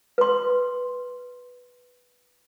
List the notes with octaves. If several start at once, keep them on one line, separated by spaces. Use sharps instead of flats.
B4 C6